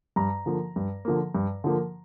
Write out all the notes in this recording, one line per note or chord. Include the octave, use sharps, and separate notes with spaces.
G2 A#5
D3 F3 A#3
G2
D3 F3 A#3
G2
D3 F3 A#3